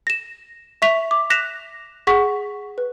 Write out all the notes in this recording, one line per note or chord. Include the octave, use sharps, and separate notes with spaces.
A#6 E7
E5 C#6 B6 F7
D6
F#6 A#6 B6 E7 F7
G#4 F#5 C#6 B6
B4